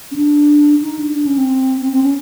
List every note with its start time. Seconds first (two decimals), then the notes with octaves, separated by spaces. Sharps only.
0.12 C#4
0.16 D4
0.82 D#4
0.99 D4
1.15 D4
1.26 C#4
1.37 C4
1.81 C4
1.92 C4
2.03 C#4